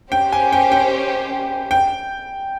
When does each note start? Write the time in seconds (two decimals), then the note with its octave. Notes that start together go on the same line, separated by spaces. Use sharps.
0.12 C#4 G4 C5 G5
0.32 G#5
0.53 G5
0.72 G5
1.71 G5